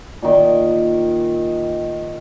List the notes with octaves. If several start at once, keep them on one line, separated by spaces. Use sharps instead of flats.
A#2 D#3